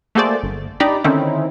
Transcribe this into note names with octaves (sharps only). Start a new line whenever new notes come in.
A3 A#3 F#4 G#4 C5 D5
G1
D4 D#4 G4 D5 A#5 B5
D3 D#3 C4 C#4 D#4 E4